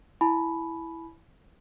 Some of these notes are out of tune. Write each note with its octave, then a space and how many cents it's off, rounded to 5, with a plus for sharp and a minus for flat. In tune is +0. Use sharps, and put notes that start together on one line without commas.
E4 +0 G#5 +45 B5 +0